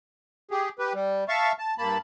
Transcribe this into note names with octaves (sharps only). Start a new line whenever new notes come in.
G4 G#4
G4 B4
G3
E5 F5 A5 C#6
A5
G2 A#3 A5 B5